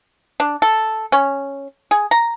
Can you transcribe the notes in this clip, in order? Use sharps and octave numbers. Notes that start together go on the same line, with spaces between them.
D4
A4
C#4
G#4
A#5